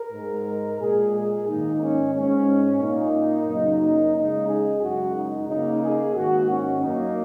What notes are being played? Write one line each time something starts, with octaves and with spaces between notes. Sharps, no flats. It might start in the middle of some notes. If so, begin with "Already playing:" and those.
Already playing: A#4
G#2 G#3
A#2 G#3 G#4
G#4
G#2 D#3 A#3 D#4
C#4
G#2 G#3 C#4
A#2 A#3 D#4
F#2 C#3 F#3 A#3
C#3 G#3 D#4
G#4
F#2 C#3 G#3 F#4
D#4
C#3 A#3 D#4
G#4
G#2 D#3 A#3 F#4
C#4
F#2 F#3 A#3 D#4